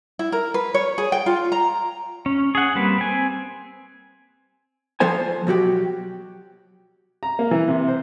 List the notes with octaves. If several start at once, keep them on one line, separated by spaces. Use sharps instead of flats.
E4
A#4
B4
C#5
G#4
G5
F4
A#5
C#4
G#4 F#5
G3 A#3 C4 B4
C4 G#5
F3 B3 A4 C5 G#5
B2 F#3 F#4 G4
A#5
A#3
E3
C3
C5